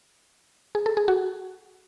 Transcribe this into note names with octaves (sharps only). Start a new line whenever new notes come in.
G#4
A4
G#4
F#4